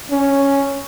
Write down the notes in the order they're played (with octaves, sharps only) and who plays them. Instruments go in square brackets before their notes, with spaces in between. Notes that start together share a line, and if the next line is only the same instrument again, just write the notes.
[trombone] C#4